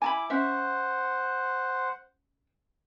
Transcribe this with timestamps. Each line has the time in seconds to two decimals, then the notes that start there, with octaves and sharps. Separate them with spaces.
0.02 E4 G#5 A5 B5 D6
0.30 C#4 C5 E5 F#5